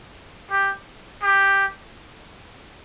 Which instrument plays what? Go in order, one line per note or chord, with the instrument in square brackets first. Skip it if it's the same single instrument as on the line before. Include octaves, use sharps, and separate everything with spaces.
[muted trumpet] G4
G4